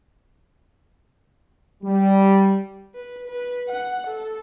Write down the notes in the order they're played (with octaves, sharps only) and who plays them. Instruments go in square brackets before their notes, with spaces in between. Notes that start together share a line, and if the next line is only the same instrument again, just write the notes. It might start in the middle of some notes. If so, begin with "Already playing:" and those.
[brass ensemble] G3
[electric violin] B4
B4
F#5
A4